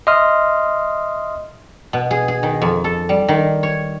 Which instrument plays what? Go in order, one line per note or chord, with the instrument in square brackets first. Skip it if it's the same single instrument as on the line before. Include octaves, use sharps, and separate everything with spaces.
[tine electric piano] D#5 E5 C6 D#6 F6
[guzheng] B2
G#4
G#4
D#3
F2
A4
G3
D#3
C#5